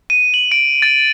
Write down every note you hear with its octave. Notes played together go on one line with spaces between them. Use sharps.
D#7
F#7
D7
A6